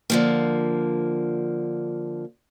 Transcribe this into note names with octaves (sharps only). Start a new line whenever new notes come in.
D3 F3 A#3